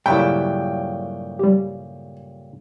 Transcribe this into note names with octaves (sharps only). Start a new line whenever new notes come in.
G2 A#2 C#3 F#3 A3 E4 G5
G3 G4